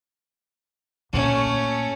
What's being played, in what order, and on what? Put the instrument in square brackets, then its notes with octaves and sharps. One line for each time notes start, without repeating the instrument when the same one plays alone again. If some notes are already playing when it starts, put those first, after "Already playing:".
[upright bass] A#2 [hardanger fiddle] A3 C#4